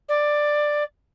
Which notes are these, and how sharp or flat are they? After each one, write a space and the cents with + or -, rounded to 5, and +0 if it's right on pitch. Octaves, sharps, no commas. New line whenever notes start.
D5 +10